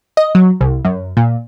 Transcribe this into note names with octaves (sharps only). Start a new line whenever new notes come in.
D#5
F#3
C2
F#2
A#2